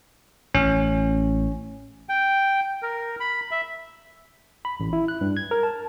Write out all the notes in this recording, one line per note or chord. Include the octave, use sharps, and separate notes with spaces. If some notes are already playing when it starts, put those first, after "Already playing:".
A1 C#4
G5
A#4
B5
E5
B5
A1
E4
F#6
G2
G#6
A#4
A5